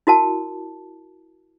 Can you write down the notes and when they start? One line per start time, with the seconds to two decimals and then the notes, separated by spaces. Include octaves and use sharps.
0.07 E4 F#4 A#4 A5